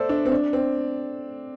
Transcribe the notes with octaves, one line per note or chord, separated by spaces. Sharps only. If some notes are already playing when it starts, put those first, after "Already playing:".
Already playing: A4 C5 D5 E5
D4
C4
D4
C4